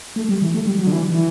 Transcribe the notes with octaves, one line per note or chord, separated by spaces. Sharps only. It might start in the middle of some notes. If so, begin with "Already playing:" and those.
A3
G3
E3
A3
G3
F#3
D3
E3
E3